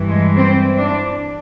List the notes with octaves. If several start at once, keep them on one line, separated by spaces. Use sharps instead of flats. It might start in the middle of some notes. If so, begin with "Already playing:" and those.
Already playing: G2 E3
G#3
C4
D4